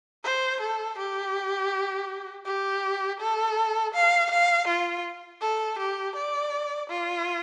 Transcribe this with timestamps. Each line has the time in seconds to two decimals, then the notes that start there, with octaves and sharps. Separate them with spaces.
0.24 C5
0.60 A4
0.98 G4
2.46 G4
3.20 A4
3.94 F5
4.31 F5
4.68 F4
5.41 A4
5.79 G4
6.16 D5
6.89 F4